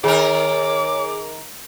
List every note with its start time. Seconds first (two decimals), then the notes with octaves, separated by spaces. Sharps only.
0.04 D#3 G#4 A#4 C#5 D6